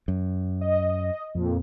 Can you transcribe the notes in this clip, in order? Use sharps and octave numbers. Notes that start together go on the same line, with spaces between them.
F#2
D#5
F2 A#2